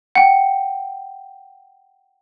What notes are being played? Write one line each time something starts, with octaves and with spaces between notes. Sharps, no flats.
F#5 G5